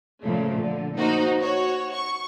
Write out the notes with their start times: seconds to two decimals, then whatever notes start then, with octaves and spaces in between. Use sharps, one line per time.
0.21 A#2 C#3 F3 A3
0.60 D3
0.97 A#3 D#4 F#4 C5
1.42 F#4 C#5
1.94 C#6